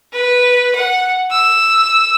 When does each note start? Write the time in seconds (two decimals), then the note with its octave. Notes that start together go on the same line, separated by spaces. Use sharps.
0.13 B4
0.75 F#5
1.31 E6